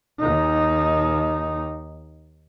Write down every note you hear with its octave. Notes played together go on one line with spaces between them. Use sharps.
D#2 D#4